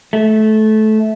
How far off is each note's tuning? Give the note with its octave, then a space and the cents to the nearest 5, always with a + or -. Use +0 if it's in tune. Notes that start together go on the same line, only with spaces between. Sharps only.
A3 -20